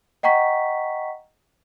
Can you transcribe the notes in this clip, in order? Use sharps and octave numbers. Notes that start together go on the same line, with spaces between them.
D#5 F#5 G5 A#5 C#6 B6